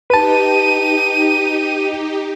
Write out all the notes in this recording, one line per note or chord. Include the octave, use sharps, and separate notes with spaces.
D#4 G4 B4 A5 D#7